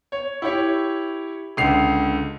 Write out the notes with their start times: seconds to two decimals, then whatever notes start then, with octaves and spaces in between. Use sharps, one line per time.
0.12 C#5
0.42 E4 G4 C#5
1.57 C#2 D3 C7 F7